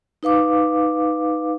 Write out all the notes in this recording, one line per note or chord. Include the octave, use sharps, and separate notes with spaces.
D#4 B4 F5 D6